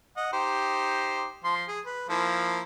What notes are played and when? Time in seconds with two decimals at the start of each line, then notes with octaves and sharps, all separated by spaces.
0.17 D#5 F#5
0.33 D#4 G4 C5
1.44 F3 C6
1.68 G#4
1.86 B4
2.09 F3 A#3 E4